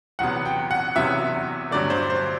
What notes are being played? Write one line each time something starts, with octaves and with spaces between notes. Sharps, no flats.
E2 C3 F#3 B3 F#5
G5
F#5
E2 C3 F#3 B3 E5
G2 D3 F#3 A3 D5
C5
C5